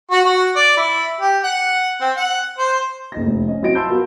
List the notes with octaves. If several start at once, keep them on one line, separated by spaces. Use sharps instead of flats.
F#4
F#4
D5
E4
G4
F#5
C4
F#5
C5
F#1 D#4 A#6
F1
C#4 D#5
F#3 C4 E4 D#5 A#6 D7
F5 A5 B5 C6 E6 G6
B3 F#4 A#4